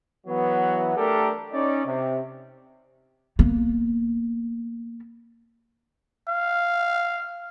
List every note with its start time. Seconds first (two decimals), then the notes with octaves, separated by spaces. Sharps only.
0.27 E3 F#3 B3
0.96 A3 D4 G4 A4 A#4
1.52 C#4 D#4 D5
1.86 C3
3.39 A#3 B3
6.28 F5